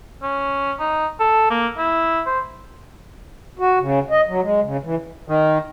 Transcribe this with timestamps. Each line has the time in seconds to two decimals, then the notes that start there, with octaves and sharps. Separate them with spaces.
0.22 C#4
0.79 D#4
1.20 A4
1.50 A#3
1.78 E4
2.26 C5
3.59 F#4
3.80 C#3
4.11 D#5
4.27 F#3
4.41 G#3
4.63 C#3
4.84 E3
5.29 D#3